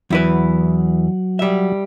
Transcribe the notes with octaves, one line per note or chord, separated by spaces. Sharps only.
E2 F#3 E4 B4
G3 E5